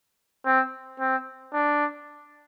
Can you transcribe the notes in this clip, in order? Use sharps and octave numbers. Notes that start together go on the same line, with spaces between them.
C4
C4
D4